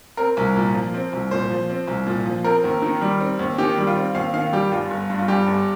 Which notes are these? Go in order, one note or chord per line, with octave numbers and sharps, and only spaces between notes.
C4 A#4
C2
A#2
F3
C4
C2
A#2 C5
F3
C4
C2
A#2
F3
C4 A#4
D#2
D#3
G3
C4
D#2
D#3 G4
G3
F4
C4
D#2 F5
D#3 F5
G3 G4
G1 F4
G1
G2
F4
G3 G4
G1